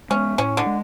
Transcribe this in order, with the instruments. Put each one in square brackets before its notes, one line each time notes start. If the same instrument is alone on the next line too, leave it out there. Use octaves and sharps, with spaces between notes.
[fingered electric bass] G#3 B3 [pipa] C#4
[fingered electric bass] A2 [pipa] C#4
[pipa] D3
[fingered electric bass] G#3